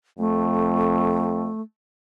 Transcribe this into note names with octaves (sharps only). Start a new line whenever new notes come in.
F2 A3